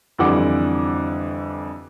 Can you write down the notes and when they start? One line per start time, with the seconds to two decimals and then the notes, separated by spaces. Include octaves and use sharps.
0.18 F2 D3 E3 G3 F#5 D6